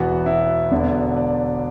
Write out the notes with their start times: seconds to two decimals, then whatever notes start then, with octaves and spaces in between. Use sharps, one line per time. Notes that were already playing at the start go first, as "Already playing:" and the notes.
Already playing: E1 E2 E3 B3 F#4
0.26 E4
0.71 E1 E2 D3 B3 D4
1.17 D5